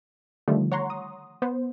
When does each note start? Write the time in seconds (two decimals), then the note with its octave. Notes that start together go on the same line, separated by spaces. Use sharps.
0.48 D3 D#3 F3 G3 A3
0.72 C#5 F#5 A#5 C6 C#6
0.90 D#6
1.42 B3 C5